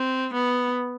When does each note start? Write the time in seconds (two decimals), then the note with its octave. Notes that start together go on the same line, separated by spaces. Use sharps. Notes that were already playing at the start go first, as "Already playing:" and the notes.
Already playing: C4
0.33 B3